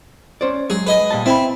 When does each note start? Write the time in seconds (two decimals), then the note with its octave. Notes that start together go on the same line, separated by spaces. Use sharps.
0.41 C#4 C5 D5
0.70 F#3 G#3 G#4
0.87 B4 D#5 G#5
1.10 A#2 G3 A5
1.26 C4 E4 B5